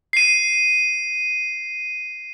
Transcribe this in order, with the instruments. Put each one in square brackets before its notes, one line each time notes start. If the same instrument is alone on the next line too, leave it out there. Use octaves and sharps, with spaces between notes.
[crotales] C7 D#7